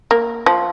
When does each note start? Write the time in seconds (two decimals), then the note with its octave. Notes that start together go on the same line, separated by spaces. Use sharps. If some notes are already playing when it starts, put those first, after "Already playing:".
0.11 A#3
0.46 F3